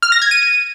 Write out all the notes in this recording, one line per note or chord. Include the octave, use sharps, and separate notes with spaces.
F6
A#6
G#6
D#7